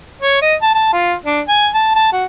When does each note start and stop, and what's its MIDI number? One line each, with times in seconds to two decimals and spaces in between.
0.22 0.40 73
0.42 0.55 75
0.62 0.75 81
0.75 0.91 81
0.93 1.14 65
1.26 1.41 62
1.49 1.68 80
1.74 1.96 81
1.96 2.09 81
2.13 2.25 66